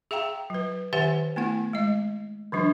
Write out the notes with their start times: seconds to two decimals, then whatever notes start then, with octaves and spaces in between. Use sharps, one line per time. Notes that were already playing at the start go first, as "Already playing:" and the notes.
0.11 G#4 E5 F5 G5 A#5
0.50 F#3 B4
0.93 D#3 G4 B4 E5 F#5 G#5
1.36 A3 B3 E4 F#5
1.73 G#3 D#5
2.52 D3 E3 F#3 D4